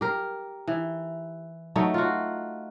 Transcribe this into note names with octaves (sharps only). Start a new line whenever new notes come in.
G4 A#4
E3
F#3 A3 D#4
F4 F#4